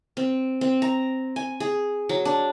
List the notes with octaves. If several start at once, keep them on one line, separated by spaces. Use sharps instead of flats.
C4
C4
A#5
G#5
G#4
F#3
D4